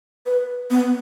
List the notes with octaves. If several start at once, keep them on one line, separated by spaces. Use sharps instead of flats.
B4
B3